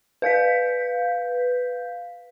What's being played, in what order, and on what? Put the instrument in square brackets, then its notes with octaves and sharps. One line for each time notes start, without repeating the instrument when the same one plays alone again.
[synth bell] B4 F5 G6 B6